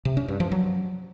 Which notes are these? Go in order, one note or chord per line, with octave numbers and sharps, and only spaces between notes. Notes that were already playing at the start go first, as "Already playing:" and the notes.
C3
C#4
G2
F3
F#3